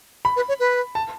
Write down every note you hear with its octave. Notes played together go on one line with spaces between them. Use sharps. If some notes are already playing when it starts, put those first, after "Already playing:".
B5
B4
C#5
B4
A5